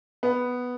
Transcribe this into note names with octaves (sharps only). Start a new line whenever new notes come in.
B3